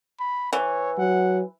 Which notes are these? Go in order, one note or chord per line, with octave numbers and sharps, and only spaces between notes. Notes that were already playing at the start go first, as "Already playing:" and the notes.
B5
E3 C#5
F#3 F#5